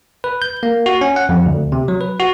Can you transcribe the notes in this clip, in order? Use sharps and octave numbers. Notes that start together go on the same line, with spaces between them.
B4
G6
A#3
F#4
C#4
F#5
F2
D2
C3
F#3
B4
F#4